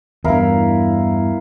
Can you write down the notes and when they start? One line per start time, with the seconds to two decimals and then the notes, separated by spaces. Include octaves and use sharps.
0.24 E2 G2 E4 A#4 F5